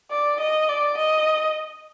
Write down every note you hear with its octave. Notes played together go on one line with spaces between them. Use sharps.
D5
D#5
D5
D#5